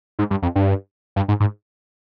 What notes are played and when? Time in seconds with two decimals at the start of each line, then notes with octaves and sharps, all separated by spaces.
0.19 G#2
0.31 G2
0.42 F2
0.55 G2
1.16 G2
1.28 G#2
1.40 G#2